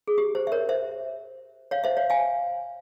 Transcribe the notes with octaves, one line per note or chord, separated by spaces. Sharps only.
G#4
G4
C5
E5
A#4 C#5
C5 E5
C#5 F5
C5 E5
C#5 F5
F5 G#5